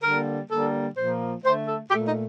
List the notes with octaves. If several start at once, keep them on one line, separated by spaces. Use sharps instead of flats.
D3 G3 A#3 A#4
D3 G3 A#3 A4
A#2 F3 A#3 C5
D3 A3 C5
A4
A#2 A3 G4
D#4